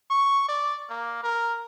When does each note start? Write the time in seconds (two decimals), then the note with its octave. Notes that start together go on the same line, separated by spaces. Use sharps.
0.10 C#6
0.48 D5
0.89 A#3
1.23 A#4